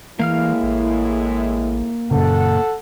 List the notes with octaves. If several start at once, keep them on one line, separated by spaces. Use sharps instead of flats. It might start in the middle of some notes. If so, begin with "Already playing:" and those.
A2 E3 G#3 A#3 E4 F5 F6
A1
F#2 A#2 C#3 A4 F#5